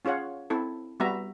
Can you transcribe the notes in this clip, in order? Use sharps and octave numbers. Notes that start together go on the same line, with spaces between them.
C#4 F4 G#4 C#5 F#5
C4 E4 A4
G3 B3 F#4 E5 A#5